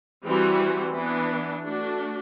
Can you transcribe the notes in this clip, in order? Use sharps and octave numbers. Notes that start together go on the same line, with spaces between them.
E3 G3 C4 F#4
E3 B3 D4
A3 D4 F#4